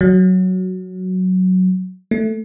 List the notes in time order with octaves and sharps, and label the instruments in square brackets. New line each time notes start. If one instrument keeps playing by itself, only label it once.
[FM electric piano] F#3
A3